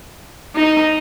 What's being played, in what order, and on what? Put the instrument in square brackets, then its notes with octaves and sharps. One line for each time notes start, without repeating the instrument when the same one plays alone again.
[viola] D#4